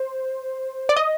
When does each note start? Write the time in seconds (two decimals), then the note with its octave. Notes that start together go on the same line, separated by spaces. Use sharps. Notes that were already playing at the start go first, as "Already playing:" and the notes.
Already playing: C5
0.89 D5
0.96 D#5